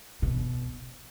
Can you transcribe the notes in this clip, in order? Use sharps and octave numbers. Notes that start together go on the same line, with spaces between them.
B2